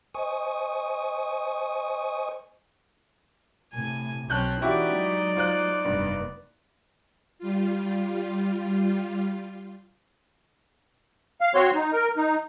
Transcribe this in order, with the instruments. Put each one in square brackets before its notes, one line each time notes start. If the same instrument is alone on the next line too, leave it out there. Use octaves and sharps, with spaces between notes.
[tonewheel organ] C5 D#5 G#5 C#6 D#6
[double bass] A2 C3 [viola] G#5
[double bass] B1 F#3 [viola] C4 C#4 [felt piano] A5 F#6 G6
[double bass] E3 C#4 [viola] D#4 D5 [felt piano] E4 F#4 G4
[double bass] F#3 G#3
[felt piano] F4 C5 F#6
[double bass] F1 B3 [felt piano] G2
[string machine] G3 F4
[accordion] F5
C4 F#4 C#5 C6
D#4
A#4
D#4